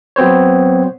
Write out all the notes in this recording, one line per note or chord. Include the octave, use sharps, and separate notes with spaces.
F#3 B3 C4 C5 C#5